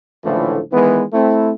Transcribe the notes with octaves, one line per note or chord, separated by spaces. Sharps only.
C#2 A2 D3 E3 F3 A3
D#3 E3 G#3 B3
A3 C4 E4